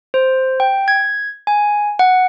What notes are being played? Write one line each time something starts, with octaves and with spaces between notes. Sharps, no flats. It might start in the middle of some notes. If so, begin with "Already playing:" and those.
C5
G5
G#6
G#5
F#5